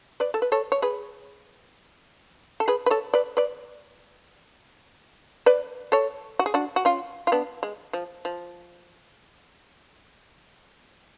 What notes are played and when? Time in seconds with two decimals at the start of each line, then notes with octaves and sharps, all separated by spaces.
0.20 B4 D5
0.34 A4
0.42 B4
0.52 A4 C#5
0.72 C#5
0.82 G#4 B4
2.60 A4
2.68 G#4 B4
2.86 B4
2.90 A4 C#5
3.14 B4 D5
3.37 B4 D5
5.46 B4 D5
5.92 A4 C#5
6.39 F#4
6.46 G#4
6.54 D4 F#4
6.76 F#4
6.85 C#4 F4
7.27 F4
7.32 B3 D4
7.63 G#3
7.93 F3
8.25 F3